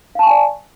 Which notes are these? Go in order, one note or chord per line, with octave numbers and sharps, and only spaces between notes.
D5 F5 G#5 A5 C#6